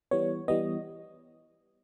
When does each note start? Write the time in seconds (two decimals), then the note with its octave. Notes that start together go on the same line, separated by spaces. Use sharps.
0.11 E3 G3 B3 C#5
0.48 E3 G3 B3 D#5